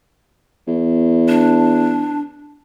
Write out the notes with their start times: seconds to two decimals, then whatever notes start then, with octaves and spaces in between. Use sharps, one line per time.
0.68 E2
1.29 D4